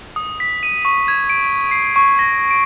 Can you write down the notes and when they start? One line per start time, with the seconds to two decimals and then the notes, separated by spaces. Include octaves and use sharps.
0.16 D#6
0.40 B6
0.63 D#7
0.85 C#6
1.08 G#6
1.30 D7
1.71 C7
1.96 C#6
2.19 A#6
2.51 D7